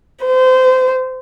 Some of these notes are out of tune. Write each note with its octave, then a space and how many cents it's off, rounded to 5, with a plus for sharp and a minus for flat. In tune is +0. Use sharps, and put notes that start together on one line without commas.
C5 -25